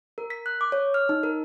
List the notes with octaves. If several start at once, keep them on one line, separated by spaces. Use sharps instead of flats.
A#4
B6
F#6
D6
C#5
F6
D#4
A#4